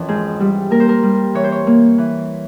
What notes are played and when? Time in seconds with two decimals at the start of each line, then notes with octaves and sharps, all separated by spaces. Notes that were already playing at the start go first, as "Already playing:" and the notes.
Already playing: F2 E3 C#4 A#4
0.08 G#2 G#4
0.40 G3
0.71 A#3 A#4
0.80 C5
0.89 A#4
1.03 G3
1.34 E3 C#5
1.44 C5
1.52 C#5
1.67 A#3
1.98 E3